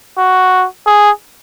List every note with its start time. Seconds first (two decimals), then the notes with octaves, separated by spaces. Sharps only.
0.18 F#4
0.87 G#4